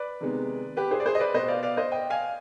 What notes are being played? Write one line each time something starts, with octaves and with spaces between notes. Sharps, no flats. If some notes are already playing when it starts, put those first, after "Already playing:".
Already playing: B4 D5
C3 D#3 G#3 B3
G4 B4
G#4 C5
D5
G#4 C5
D#5
B4 D5
B2 B3 C5 D#5
D5 F5
D5 F5
C5 D#5
D#5 G5
F5 G#5